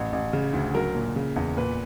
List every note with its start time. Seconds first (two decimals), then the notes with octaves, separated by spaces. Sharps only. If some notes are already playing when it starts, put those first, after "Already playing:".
Already playing: A1
0.13 A1
0.33 C#3
0.53 D2
0.74 F#3 A#4
0.95 A#2
1.16 C#3
1.36 E2
1.57 A#2 B4